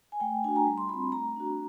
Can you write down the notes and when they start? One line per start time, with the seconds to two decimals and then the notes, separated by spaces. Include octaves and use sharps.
0.12 G#5
0.20 A3 G5
0.44 D4 F#4 G#5
0.56 A#5
0.67 G3
0.78 C6
0.89 C4 F4 B5
1.12 A3 A#5
1.36 D4 F#4